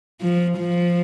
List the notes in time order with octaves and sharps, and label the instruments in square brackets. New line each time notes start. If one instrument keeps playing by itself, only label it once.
[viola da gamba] F3
F3